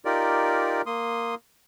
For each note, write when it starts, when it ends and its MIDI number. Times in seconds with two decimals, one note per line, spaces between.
0.05 0.82 63
0.05 0.82 65
0.05 0.82 67
0.05 0.82 70
0.05 0.82 74
0.86 1.35 58
0.86 1.35 84
0.86 1.35 87